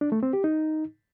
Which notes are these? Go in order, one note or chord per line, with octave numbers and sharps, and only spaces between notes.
D4
A3
C4
G4
D#4